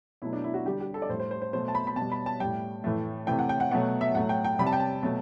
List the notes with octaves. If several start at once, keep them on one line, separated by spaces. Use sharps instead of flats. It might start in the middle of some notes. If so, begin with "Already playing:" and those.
B2 F#3 A3 E4
D4
E4
F#4
D3 G3 G4
G4
A4
D5
A2 G3 C5
C5
C5
C5
B2 F#3 A3 C5
A5
B5
B5
B2 G3 A5
B5
A5
A2 G3 G5
A2 E3 A3
C3 E3 A3 G5
F#5
G5
F#5
B2 F#3 A3 F#5
E5
A2 F#3 A3 F#5
G5
G5
C3 G3 B5
A5
G5
A5
B2 F#3 A3